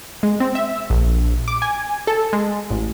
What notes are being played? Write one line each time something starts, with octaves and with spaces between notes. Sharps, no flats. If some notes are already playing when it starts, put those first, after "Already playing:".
G#3
C4
E5
A#1
D6
G#5
A4
G#3
A1